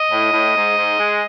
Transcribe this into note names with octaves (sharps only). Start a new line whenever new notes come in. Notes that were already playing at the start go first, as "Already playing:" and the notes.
Already playing: D#5
A2
A2
G#2
G#2
G#3